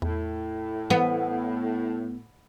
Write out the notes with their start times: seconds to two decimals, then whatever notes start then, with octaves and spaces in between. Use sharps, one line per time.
0.02 E2 A2
0.90 E3 B3